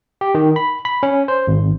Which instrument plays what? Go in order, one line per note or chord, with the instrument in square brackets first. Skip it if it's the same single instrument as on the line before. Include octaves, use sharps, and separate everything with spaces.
[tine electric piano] G4
D#3
B5
B5
C#4
C5
G#1